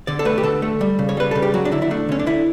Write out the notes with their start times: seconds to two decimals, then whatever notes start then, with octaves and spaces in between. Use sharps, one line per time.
0.07 D3 D5
0.19 A4
0.25 A3 B4
0.38 G4
0.43 D3 A4
0.62 A3
0.81 G3
0.99 C#3
1.09 C#5
1.17 G3 B4
1.31 C#3 A4
1.42 G4
1.54 F#3 F#4
1.65 D4
1.72 D3 E4
1.82 E4
1.91 A3 D4
2.09 D3 C#4
2.19 D4
2.26 D3 E4